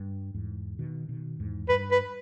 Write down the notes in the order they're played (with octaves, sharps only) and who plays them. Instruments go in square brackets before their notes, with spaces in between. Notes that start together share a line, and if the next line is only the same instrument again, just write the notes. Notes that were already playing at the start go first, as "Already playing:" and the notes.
Already playing: [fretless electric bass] G2
E2 G#2
B2 D#3
B2 D#3
E2 G#2
[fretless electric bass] G2 [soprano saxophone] B4
[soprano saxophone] B4